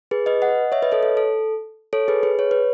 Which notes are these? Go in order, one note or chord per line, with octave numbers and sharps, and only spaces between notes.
G#4 B4
B4 D#5
D#5 F#5
C#5 E5
B4 D#5
A4 C#5
A4
A4
A4 C#5
G#4 B4
G#4 B4
C#5
B4